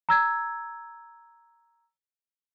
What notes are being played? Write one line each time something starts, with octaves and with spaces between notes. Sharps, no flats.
A#5 E6 G#6